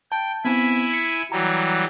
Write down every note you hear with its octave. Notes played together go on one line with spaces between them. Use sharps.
G5 A5
B3 C4 E4 G#5 B5
C#7
E3 F#3 G3 A#5